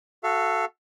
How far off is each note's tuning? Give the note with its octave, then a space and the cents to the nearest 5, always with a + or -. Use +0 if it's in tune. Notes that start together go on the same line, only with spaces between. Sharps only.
F#4 +0 A4 +0 F5 -35